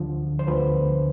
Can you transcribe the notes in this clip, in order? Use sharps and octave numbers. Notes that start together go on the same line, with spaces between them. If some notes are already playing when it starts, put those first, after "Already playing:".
Already playing: D2 D3 F3
C5
D2 D3 F3 B4